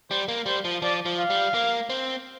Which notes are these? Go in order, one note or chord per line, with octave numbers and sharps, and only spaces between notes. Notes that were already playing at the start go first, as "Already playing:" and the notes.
G3 C5
A#3
G3 C5
F3
F3 D5
F3
F5
G3
A#3
C4